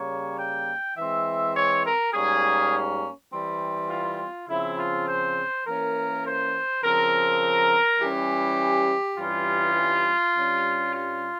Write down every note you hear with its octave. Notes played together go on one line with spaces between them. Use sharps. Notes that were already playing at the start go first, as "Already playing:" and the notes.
Already playing: C#3 G3 A#3 C#5
G5
E3 G#3 C4 E5
C#5
A#4
G#2 G3 A#3 C#4 G#4
E3 G3 C4
F4
C#3 F3 C4 E4
F4
C5
E3 A#3 C#4 A#4
C5
C#3 F3 C4 A#4
E3 G3 C#4 G4
G2 E3 G3 C#4 F4
G2 G3 C#4
F4